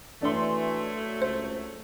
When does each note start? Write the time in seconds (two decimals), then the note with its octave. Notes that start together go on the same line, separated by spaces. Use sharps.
0.22 E3 F#3 A3 D4 C6
1.22 C#2 C5